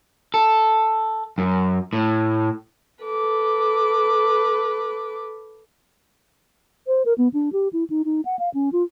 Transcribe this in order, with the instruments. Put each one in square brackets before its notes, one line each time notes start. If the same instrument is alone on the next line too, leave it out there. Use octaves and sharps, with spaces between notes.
[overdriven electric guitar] A4
F#2
A2
[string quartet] A4 B4 D6
[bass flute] C5
A#4
B3
D4
G4
E4
D#4
D#4
F#5
F5
C#4
F4